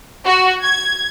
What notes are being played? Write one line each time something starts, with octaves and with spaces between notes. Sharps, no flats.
F#4
G#6